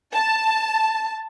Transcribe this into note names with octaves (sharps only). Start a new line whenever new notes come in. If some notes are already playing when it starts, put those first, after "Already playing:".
A5